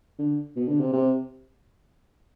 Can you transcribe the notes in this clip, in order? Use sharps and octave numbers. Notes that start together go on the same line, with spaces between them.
D3
B2
D3
C3
C3